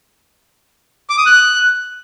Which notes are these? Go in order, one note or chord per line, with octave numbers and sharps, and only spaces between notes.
D6
D#6
F#6